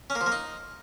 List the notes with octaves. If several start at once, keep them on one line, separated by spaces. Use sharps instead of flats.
C#4
A#3
F3
A#3
D#4